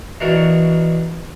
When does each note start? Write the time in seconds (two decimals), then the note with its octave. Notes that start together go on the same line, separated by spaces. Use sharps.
0.21 B2 E3 D4 F#4 A#4